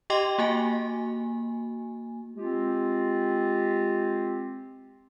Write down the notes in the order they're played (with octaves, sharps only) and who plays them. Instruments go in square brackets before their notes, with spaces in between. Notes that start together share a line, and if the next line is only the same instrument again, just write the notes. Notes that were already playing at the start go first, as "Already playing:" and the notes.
[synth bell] G4 D#5 G5 C6 D6
A#3 F#4 G#5
[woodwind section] G#3 C4 F4 G4